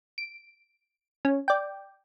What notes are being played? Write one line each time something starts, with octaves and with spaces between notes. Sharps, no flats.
D7
C#4
D5 G5